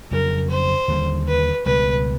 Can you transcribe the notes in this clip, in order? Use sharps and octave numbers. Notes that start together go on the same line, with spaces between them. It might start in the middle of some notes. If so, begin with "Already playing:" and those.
F2 C#3 F#3 A#4
C5
D#2 D3 G3
B4
C#2 B2 G3 B4